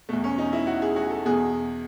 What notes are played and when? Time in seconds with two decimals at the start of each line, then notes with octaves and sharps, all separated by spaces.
0.09 E2 B2 A3
0.24 C#4
0.38 D#4
0.53 E4
0.67 F#4
0.82 G#4
0.96 F#4
1.10 A4
1.25 E2 B2 G#4